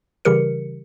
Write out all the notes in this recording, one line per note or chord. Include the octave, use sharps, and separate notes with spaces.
C#3 E3 G3 G4 A#4 C#7